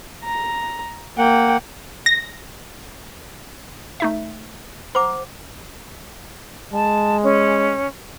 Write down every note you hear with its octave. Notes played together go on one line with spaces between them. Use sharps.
A#5
A#3 F#5 G5
A#6
A3 D#4 E5
C5 F#5 A#5 D6
G#3 A5
C#4